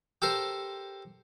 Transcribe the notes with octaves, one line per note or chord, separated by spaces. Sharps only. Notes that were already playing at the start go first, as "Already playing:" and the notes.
G4 A4 A#4 C5